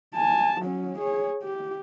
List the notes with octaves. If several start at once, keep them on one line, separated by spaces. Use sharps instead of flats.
G#5 A5
F#3 C#4
G#4 C#5
G4